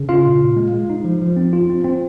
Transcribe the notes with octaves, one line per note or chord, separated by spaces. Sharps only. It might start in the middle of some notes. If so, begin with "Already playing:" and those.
Already playing: C#3
C#4 F4 F5
A#2
A#2
G#3
G#3
D#4
F3
F3
C4
F4
C4
C4